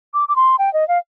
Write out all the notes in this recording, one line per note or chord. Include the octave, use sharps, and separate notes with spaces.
D6
D6
C6
G5
D#5
F5